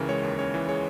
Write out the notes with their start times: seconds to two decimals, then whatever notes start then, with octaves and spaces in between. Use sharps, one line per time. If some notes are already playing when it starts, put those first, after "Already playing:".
Already playing: C#2 C#3 E3 A#4
0.09 G#3 C#5
0.23 D#2
0.38 C#3 C#5
0.54 E3
0.69 G#3 C#5